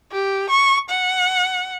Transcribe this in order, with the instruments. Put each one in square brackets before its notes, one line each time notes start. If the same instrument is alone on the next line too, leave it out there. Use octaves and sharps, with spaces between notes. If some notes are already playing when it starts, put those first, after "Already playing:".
[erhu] G4
C#6
F#5